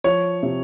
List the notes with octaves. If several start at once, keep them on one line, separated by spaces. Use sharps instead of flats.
F3 C#5
C3